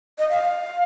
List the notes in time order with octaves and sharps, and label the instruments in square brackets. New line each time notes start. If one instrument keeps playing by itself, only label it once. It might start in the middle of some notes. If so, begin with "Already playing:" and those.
[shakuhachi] D#5
F5